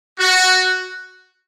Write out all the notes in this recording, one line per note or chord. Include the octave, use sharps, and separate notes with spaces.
F#4